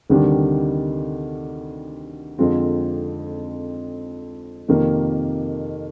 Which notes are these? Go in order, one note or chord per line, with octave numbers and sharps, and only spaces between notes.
D2 C3 D#3 G3 D4
F2 D3 G#3 C4 F4
F2 C3 D#3 A#3